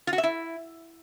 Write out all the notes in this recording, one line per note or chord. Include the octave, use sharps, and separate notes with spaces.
F4
F#4
E5
E4